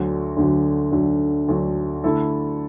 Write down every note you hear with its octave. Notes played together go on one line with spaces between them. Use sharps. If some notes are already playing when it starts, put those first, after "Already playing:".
Already playing: D2 D3 F#3
D2 D3 F#3
D2 D3 F#3
D2 D3 F#3
D3 A3 E4 A4